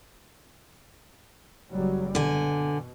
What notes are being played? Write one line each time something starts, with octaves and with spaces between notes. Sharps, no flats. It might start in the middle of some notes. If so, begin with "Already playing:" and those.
F#1 F#3 G3
B2 D3 G#5